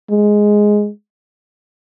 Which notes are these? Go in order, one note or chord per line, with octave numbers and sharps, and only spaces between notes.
G#3